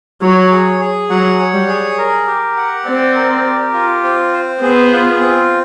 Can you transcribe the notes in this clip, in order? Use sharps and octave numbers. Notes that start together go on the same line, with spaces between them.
F#3 C#5
G#4
G#4
F#3 F#5
C#5
G3
G#4
A#4
G4
F#5
C4 D5
A#4
G4
F4
C4
C5
B3 G#4
F4
C4